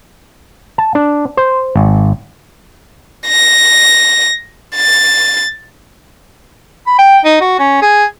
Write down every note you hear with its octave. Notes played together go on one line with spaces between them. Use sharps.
A5
D4
C5
G#1
A#6
A6
B5
G5
D#4
F#4
C#4
G#4